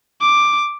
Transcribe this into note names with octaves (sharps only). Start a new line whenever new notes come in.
D6